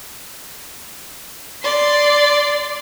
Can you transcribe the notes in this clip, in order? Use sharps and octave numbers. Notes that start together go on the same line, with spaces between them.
D5 C6